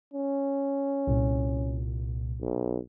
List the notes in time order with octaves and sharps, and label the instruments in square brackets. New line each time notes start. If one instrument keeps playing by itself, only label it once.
[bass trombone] C#4
[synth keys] C2 A#2
[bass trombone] B1